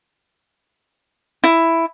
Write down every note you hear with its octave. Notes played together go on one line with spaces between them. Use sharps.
E4